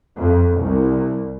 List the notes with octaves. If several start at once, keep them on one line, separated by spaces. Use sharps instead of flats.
F2
C2